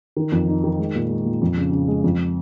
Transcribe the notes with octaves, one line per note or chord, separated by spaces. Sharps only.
D#3
F2
D#4
D#3
G#3
A#2
G#3
A#2
F2
C#3
C#3
G#3
F2